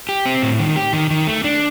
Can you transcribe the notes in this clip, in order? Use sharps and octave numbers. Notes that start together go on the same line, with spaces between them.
G4
C4
A2
D#3
G4
D#3
D#3
A3
D4